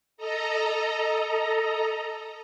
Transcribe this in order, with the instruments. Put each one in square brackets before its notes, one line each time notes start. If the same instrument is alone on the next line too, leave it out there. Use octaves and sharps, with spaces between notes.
[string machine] A4 D#5 A#5